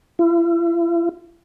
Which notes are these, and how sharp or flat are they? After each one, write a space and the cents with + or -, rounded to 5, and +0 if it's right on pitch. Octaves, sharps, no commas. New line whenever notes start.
E4 +45